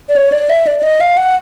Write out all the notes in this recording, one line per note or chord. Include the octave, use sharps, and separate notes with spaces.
D5
C#5
D5
E5
D5
D5
D#5
F5
F#5